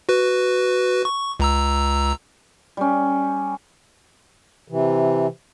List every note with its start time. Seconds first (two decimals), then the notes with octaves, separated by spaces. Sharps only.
0.09 F#4 B4
1.05 C#6
1.40 C#2 A#5 E6
2.77 G3 C#4
4.68 C3 E3